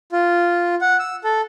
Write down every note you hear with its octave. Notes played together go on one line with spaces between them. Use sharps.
F4
F#5
E6
A4